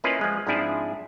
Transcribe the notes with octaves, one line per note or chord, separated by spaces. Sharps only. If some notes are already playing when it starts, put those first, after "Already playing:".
A#3 C#4 E4 F4 B4 D#5
F3 G#3
G#2 F3 C4 D4 E4 G#4